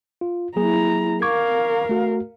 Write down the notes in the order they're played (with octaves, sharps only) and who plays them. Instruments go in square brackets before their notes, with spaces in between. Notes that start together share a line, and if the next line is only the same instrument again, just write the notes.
[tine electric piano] F4
[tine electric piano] F#3 A#3 G#4 [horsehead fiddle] E4 A#5
[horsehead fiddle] A#4 F5 [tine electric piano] C#6 D6 G#6
[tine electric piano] A3 F#4